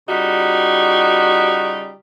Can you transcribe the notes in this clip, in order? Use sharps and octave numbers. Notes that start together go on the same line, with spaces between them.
C#3 G3 D#4 F4 F#4